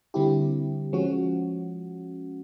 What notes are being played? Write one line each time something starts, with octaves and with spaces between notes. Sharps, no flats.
D3 G3 C4 E4 G4
F3 G#3 C#4 F#4